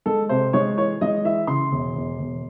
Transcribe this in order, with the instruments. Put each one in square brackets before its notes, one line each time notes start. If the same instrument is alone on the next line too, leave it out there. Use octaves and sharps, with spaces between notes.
[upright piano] G#3 A4
C3 C5
G#3 C#5
E3 C#5
G#3 D#5
E3 E5
C#3 C6
E1
E1
E1